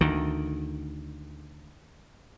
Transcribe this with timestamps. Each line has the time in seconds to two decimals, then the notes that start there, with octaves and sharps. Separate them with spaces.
0.01 D2 D#3